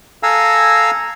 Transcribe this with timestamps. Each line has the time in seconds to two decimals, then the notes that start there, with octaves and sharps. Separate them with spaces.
0.23 A4 F5 G#5 A#5 E6